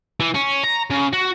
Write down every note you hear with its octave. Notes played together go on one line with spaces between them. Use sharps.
E3
C#4
A#5
C#3
F#4